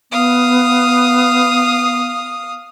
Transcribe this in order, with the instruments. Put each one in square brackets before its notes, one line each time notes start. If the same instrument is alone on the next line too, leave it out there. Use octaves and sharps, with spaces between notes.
[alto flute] B3 [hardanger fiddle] F5 D#6